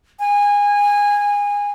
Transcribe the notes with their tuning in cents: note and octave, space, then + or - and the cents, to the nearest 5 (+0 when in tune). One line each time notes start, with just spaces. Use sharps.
G#5 -20